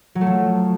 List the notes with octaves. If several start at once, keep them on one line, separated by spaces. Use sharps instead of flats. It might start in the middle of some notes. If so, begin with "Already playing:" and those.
F#3
A3
F3